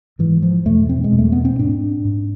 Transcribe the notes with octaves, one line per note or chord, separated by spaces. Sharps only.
G#2 E3
F3
E2 B2 A3
C4
G#3
E2 B2
A3
B3
C4
G#2 D4
G#2